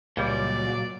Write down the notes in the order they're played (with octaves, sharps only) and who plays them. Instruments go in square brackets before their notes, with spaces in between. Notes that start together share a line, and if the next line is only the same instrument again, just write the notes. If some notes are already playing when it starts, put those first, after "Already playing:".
[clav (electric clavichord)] C#2 G3 [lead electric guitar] A#2 [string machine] F#3 [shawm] D5